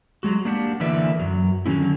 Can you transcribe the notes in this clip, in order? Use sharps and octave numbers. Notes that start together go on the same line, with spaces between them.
F#3 G#3 F#4
A#3 D4 G4 F#5
D3 E3 A#3 B4 D5 E5
F#2 F#3
D3 D#3 F#3 G3 C#4 E4